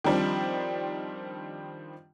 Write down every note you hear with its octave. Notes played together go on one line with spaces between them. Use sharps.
D#3 F3 G3 C4 D4